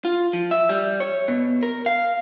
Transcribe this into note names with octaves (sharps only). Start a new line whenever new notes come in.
F4
F3
E5
G3
C#5
B2
A#4
F5